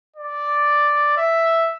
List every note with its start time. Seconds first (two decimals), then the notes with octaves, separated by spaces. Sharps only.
0.16 D5
1.17 E5